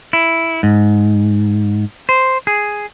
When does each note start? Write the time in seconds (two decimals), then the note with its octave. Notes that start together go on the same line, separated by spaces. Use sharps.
0.13 E4
0.63 G#2
2.09 C5
2.47 G#4